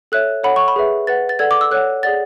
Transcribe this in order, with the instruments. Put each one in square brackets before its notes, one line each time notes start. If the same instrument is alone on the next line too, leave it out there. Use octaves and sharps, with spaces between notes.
[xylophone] A4 C#5 E5 F#6
A4 C#5 F#5 B5
C#6
B5
G#4 B4 E5
B4 F#5 A6
A6
A4 D5 F#5 G#6
D6
E6
A4 C#5 F#5 F#6
G#4 D5 F#5 A6